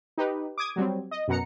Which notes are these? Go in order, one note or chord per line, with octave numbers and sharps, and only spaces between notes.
D#4 G4 B4
D6 D#6 G#6
F#3 G3 C4
D#5
F#2 B2 F#5 A#5 C#7